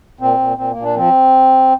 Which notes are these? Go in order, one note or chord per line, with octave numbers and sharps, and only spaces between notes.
A#2 C4
A#2
A#2 C4
A#3
A#2
D4
F3 C4